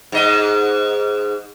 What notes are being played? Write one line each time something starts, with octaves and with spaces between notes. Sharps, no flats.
G#2 D#5